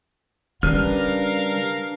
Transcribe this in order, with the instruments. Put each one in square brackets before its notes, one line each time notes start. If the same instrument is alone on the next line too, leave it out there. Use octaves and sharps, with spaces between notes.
[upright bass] C#3 [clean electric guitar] G3 [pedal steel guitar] D4 B4 F6 [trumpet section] A#4 F5